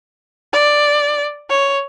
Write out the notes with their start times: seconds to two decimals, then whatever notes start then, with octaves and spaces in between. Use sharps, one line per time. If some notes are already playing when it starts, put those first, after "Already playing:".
0.53 D5
1.50 C#5